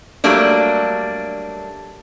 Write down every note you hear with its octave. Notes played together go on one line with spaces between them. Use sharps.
F#3 G3 A3 A#3 D4